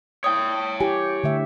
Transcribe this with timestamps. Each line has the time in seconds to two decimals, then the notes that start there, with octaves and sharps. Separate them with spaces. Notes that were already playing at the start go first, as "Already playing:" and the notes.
0.24 C#5 G5 D#6
0.80 E4 G4 G#5
1.24 D3 A3 E5